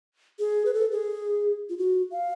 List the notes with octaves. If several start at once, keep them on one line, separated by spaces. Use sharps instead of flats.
G#4
B4
A4
G#4
F4
F#4
F5